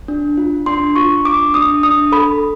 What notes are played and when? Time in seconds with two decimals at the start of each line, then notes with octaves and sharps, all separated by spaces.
0.08 D4
0.37 F4
0.66 D4 C6
0.96 F4 C#6
1.25 D4 D6
1.54 D4 D#6
1.83 D4 D#6
2.12 A4 B5